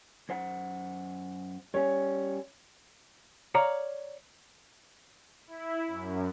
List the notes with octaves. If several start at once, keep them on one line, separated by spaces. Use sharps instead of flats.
F#2 C5 F#5
G3 C#4 C#5
C#5 D5 F5 A#5
E4
F#2